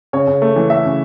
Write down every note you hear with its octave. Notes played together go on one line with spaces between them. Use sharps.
C#3 C#5
C#3
A3
E3
A3 E5
C#3